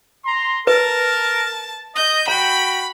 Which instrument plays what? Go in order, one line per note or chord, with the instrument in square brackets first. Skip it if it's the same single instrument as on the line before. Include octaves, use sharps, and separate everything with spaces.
[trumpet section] A#5 C6
[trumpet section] A#4 [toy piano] B4 [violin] A5
[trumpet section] D#5 [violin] G6
[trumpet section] F#4 G5 [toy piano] A#5 [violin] B5